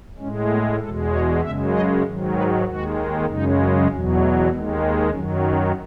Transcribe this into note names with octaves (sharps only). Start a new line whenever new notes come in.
A2 G#3 C#4
B3
E2 B2 G#3 A4
C#5
F#2 C#3 G#3 E5
D#5
G#2 D#3 F#3
B4
D#2 D#3 G#3 F#4
F#2 C#3 G#3 D#4
E2 B2 F#3 C#4
A3
D#2 D#3 G#3 B3
F#2 D#3 F#3 C#4
C#4